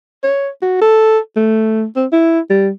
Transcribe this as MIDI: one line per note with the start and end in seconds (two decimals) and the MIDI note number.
0.23 0.49 73
0.62 0.80 66
0.81 1.19 69
1.36 1.85 57
1.96 2.06 60
2.12 2.40 64
2.50 2.70 55